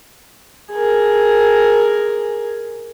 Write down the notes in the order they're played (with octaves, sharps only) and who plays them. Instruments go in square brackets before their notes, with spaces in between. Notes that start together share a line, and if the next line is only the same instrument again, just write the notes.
[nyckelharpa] G#4 A#4